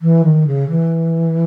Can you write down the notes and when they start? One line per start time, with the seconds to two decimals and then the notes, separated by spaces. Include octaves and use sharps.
0.01 E3
0.24 D#3
0.47 C#3
0.69 E3